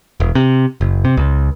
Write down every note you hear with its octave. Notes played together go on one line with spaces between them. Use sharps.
E1
C3
F#1
C3
C#2